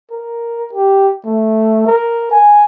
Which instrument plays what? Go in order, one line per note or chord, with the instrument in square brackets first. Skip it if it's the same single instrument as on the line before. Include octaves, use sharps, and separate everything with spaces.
[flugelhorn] A#4
G4
A3
A#4
G#5